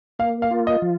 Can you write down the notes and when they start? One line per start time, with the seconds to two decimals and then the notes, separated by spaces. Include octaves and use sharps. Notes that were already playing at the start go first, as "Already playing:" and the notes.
0.19 A#3 F5
0.42 F5
0.51 F4
0.67 D#5
0.82 F3